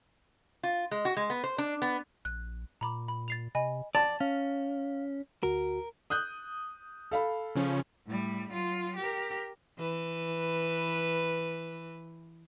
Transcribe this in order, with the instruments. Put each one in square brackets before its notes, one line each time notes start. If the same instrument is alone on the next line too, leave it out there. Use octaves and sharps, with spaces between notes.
[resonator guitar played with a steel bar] F4
G#3
F#4
G#3
B3
C5
D4
B3
[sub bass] A#1 [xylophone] F#6
[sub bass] A#2 [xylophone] A#5 B5 D6
[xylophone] B5
A6 C7 F7
[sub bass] C3 [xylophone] D#5 G#5 B5
[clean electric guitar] D5 [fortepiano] A5
[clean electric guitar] C#4 [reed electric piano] F5
[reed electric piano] D2 F#4 [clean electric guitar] A#4
[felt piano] D#6 F#6 G6
A4 F5 B5
[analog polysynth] C#3 F3 C#4
[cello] A2 G3
F#3 F4
G4 A#4
[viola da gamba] E3 B4